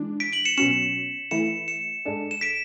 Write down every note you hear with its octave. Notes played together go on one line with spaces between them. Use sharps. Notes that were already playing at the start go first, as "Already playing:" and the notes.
Already playing: E3 G#3 D4
B6 D7
D7 F#7
C#7 E7
B2 F#3 C#4 C#7 E7
E3 A3 E4 C#7 E7
C#7 E7
G#2 G#3 D4 A4
E7
B6 D7